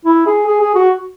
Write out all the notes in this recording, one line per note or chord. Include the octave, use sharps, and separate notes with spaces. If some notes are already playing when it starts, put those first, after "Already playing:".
E4
G#4
G#4
G#4
F#4